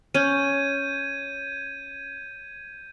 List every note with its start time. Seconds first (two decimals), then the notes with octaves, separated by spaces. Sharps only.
0.15 C#4 G6 G#6 D#7